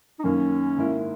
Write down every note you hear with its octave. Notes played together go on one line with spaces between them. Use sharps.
D#4
F#2 D#3 A#3 C#4
G#2 D#3 A#3 E4